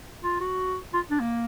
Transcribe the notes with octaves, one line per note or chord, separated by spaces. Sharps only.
F4
F#4
F4
D4
A#3